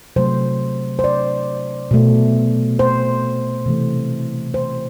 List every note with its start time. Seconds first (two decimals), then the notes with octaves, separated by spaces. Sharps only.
0.16 C3 F#3 A3 C5
0.99 C5
1.04 D5
1.91 B2 A3
2.79 C5
3.66 C3 E3 A3
4.54 C5